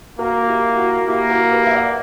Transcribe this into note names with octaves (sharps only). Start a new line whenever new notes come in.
A#3 F#4 A#4
E4 G4
F#4
A#3 E4 G4
F#4 A#4
G4 B4
E5
D5 F#5